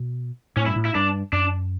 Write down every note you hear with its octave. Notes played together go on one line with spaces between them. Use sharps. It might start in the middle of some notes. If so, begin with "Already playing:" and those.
Already playing: B2
A2 C#4
G2 E4
A2
E4
G2 D4
F#2 D4